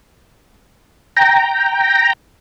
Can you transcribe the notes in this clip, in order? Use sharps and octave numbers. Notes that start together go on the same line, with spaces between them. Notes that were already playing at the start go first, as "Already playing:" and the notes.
G5 A#5